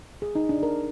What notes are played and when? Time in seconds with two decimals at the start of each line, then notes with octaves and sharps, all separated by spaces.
0.22 G#4
0.35 D#4
0.49 D4
0.63 A#4